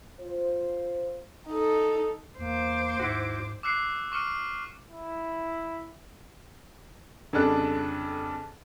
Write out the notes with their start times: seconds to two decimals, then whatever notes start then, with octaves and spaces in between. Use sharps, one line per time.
0.20 F4 C5
1.48 D#4 A4
2.39 E2 A#3 C5 D6
3.00 D#2 G#2 E4 F#4
3.63 D6 E6 F#6 C7 C#7
4.12 C#6 D6 F6 C#7 D#7
4.91 E4
7.33 F2 C#3 G3 D4 A4 F#6